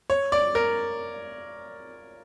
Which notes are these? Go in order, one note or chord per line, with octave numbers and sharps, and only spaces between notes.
C#5
D5
A#4